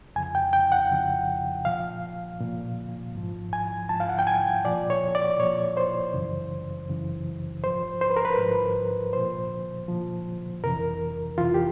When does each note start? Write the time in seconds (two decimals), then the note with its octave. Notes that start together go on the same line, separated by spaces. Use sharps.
0.16 F2 C#3 F3 G#5
0.35 G5
0.53 G5
0.72 F#5
0.90 F2 C#3 F3
1.65 A#2 F3 F5
2.41 A#2 F3
3.15 G#2 F3
3.53 G#5
3.89 G#2 F3 A5
4.00 F5
4.09 F#5
4.19 G5
4.27 G#5
4.65 A#2 F3 D5
4.90 C#5
5.15 D5
5.39 A#2 F3 C#5
5.77 C5
6.14 F#2 C#3 E3
6.89 F#2 C#3 E3
7.64 G#2 F3 C5
8.01 C5
8.10 B4
8.17 A#4
8.25 B4
8.38 G#2 F3
9.13 A#2 F3 C5
9.88 A#2 F3
10.63 F2 C3 E3 A#4
11.38 F2 C3 E3 F4
11.54 G4